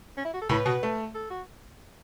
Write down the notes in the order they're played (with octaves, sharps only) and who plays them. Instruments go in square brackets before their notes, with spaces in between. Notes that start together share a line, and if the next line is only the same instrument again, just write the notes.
[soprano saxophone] C#4
E4
F#4
A4
[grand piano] A2 [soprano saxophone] B4
[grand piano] B2
A3
[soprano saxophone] A4
F#4